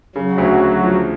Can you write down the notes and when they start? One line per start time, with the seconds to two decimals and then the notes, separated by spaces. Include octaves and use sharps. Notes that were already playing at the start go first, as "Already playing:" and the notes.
0.16 C#3 F#3
0.38 D2
0.61 D2
0.83 F3